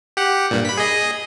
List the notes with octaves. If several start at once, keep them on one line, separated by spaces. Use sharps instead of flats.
G4 F#5
G2 A#2
B5 B6
G#4 D#5